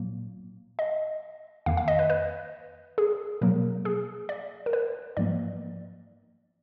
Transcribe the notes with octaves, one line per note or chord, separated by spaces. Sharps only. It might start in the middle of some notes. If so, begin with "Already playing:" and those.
Already playing: A#2 F#3 A#3
D#5
F2 D#3 A#3 F5
F5
D#5
B4
B4
G#4
B2 F#3 A#3 A#4
G#4
D5
A#4
B4
G#2 F3 A#3 D5